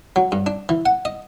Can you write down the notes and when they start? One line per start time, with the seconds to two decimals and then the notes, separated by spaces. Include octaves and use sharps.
0.16 F#3
0.32 G2
0.46 D4
0.69 E3
0.86 F#5
1.05 D#5